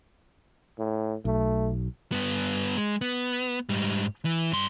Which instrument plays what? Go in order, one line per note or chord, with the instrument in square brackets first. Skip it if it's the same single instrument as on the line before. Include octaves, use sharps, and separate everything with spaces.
[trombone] A2
[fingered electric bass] B1 [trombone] A3
[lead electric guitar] G2 B3
G#3
B3
G#2 G3
E3
G2 C6